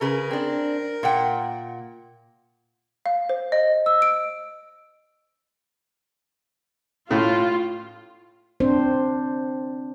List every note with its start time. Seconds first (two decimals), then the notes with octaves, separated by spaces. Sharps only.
0.01 C#3 G#4 A#4 B4
0.31 C4 D4
1.03 A#2 F#5 G5
3.06 F5
3.29 C5
3.52 D#5
3.86 E6
4.02 D7
7.11 A2 F4
8.60 C4 D4 C5